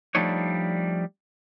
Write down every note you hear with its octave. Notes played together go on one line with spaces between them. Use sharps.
F3 G3 A3 D4 D#4 C#5